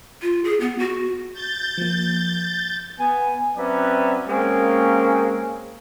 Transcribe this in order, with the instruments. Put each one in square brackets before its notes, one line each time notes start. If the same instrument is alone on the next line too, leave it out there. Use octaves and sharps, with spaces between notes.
[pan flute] F4
G#4
B3
F#4
[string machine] G6 A6
[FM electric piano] F3 A#3
[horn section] B3 G#5
F#3 C4 C#4 B4 D5 E5
G#3 A#3 C4 C#4